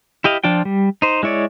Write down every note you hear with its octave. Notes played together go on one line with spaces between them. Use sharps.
E4 G4 D#5 F5
F3 D4 F4 G5
G3
D#4 C5
G#3 E4 C#5 D5